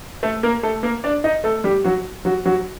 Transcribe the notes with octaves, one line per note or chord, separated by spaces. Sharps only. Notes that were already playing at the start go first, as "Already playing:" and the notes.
A3 A4
A#3 A#4
A3 A4
A#3 A#4
D4 D5
D#4 D#5
A3 A4
G3 G4
F#3 F#4
F#3 F#4
F#3 F#4